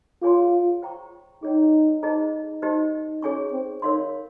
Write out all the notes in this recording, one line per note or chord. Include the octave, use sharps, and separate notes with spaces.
F4 G#4 C#5 G#5 C6
C5 G5 A#5 C#6
D#4 G#4 C#5 G5
D#4 G#4 C5 D#5 A#5
D#4 G4 C5 D#5
C#4 G#4 C#5 G#5 C#6
C4
D#4 A#4 C#5 F5 C6